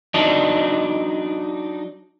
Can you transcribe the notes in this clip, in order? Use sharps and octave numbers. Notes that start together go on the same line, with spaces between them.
F#3 D4 D#4